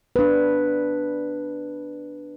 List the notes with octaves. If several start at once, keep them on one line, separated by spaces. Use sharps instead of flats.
D4 B4